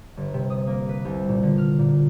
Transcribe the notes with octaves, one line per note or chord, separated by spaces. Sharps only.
G1
C3
D#6
A#3
B4
C2
A#2
D3
F6
A#2